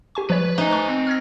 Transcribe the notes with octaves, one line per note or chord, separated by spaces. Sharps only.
G4 G#5 C#6
F3 B4 C#5
A3 D#4 C5 G#5 F#6
A5 C#6 F#6
C4
F6 G#6 A#6